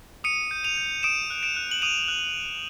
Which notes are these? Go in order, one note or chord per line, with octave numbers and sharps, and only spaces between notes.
D#6 C#7 D#7
G6
D#7 F7
G6
D#6 D7 E7
F#6
D7 E7
F#6
F#7
D#6 D#7 F7
F#6